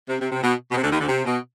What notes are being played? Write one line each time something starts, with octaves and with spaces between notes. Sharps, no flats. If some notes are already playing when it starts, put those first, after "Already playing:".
C3
C3
C3
B2
B2
C3
D2 D3
D#2 D#3
D2 D3
C3
B2